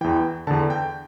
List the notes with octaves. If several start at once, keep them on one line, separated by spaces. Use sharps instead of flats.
E2 E3 G5
E2 D3 A5
G5